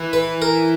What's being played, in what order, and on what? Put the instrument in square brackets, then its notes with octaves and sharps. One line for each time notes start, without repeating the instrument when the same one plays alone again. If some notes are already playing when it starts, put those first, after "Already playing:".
Already playing: [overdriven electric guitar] E3
[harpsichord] B4
A#4